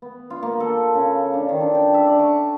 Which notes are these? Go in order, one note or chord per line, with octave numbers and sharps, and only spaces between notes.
B3
F4
A#3
A4
C#3
D4
D#3
D4
G5
E5
D5
C#6